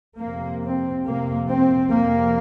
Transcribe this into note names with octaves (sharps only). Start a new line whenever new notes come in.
F2 C3 A#3
C4
F2 C3 A#3
C4
F2 C3 A#3